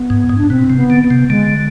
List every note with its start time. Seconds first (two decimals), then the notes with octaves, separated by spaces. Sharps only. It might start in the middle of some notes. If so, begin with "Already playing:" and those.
Already playing: B3
0.10 G#2
0.29 G#2
0.38 D4
0.50 B2 C4
0.70 C3
0.76 B3
0.90 D3
1.03 B3
1.10 C3
1.30 D3 G#3